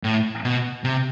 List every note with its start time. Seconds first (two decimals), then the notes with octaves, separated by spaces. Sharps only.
0.04 A2
0.44 B2
0.84 C3